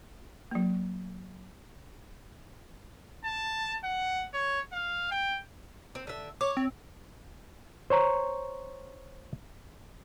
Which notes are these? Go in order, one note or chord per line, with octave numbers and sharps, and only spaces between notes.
F#3 A#3
A5
F#5
C#5
F5
G5
C4
D3 E5
C#5 D6
C4
C5 C#5 A#5